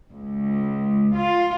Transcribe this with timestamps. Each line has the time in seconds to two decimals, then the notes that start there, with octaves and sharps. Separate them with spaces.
0.12 C#2
1.14 F4